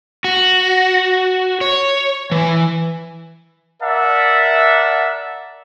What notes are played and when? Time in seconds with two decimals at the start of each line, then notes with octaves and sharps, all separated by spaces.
0.24 F#4
1.61 C#5
2.31 E3
3.82 A#4 D5 E5 F#5 A5